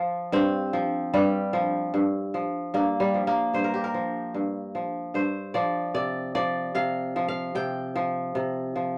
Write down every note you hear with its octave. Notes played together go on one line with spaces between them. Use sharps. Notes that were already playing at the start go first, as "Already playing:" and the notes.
Already playing: F3 F4
G2 C4
F3
G2 G3
F3
G2
F3
G2 A#3
G3
F3
A#3
G2 C5
A#4
G4
A#4
F3
G2
F3
G2 C5
F3 D5
C3 D5
F3 D5
C3 F5
F3
F5
C3 G5
F3
C3
F3